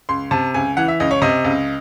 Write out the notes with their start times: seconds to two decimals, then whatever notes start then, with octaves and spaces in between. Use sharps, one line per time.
0.09 C#2 C6
0.31 C3 A5
0.54 C#2 G#5
0.77 E3 F#5
0.88 E5
1.00 C#2 D#5
1.11 C#5
1.22 C3 D#5
1.44 C#2